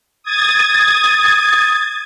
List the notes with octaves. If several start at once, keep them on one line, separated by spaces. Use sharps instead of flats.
D#6 G#6 A6